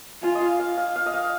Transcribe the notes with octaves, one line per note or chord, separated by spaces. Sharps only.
F4 G#5
D#5
F5
F5
F5
F5
D#5
F5